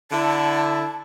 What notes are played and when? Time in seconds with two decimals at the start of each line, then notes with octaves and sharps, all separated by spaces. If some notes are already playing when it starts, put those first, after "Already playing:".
0.12 D3 E4 A5